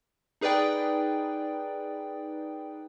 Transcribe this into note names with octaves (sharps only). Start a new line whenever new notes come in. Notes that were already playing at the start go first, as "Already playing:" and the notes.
D#4 G#4 B4 D5 G5